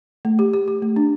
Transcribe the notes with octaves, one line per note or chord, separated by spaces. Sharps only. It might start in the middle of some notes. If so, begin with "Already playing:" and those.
A3
G4
G4
G4
A3
D4